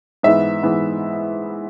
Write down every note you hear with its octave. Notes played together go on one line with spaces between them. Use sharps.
G#2 E3 B3 E5
G#2 E3 B3